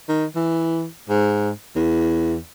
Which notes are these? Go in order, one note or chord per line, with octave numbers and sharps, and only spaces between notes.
D#3
E3
G#2
E2